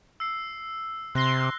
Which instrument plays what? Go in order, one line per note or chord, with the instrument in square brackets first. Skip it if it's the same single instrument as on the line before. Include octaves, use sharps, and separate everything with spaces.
[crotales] E6 C7
[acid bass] C3 [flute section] C6 [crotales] F#6 A#6 G7